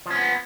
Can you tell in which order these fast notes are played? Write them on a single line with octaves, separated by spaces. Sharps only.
F3 C#4 B3